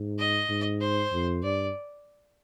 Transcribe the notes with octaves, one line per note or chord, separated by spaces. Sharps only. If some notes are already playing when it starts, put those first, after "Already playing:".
Already playing: G#2
D#5
G#2
C5
F2
G2 D5